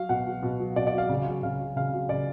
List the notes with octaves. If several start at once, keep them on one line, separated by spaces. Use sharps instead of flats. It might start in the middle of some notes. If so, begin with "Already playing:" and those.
Already playing: F#3 F5
B2 F#5
F#3
B2
F#3
B2 D5
D5
F#3
F5
C#3
F#3
C#3 F5
F#3
C#3 F5
F#3
C#3 D5